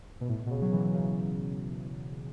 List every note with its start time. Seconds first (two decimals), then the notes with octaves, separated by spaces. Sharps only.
0.21 B2
0.29 A2
0.46 B2
0.51 C#3
0.62 F#3
0.72 E3
0.94 C#3